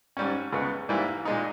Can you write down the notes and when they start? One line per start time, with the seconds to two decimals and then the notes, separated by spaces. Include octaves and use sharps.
0.17 G#2 G3 C#4
0.52 C#2 C#3 G#3 B3
0.89 G#2 E3 G3 A#3 E4
1.25 A#2 G#3 D#4